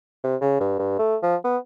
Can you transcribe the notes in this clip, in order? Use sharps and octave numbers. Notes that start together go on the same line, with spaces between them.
C3
C#3
G2
G2
A3
F3
B3